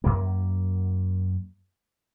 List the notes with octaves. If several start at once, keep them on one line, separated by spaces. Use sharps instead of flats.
F#2 A#3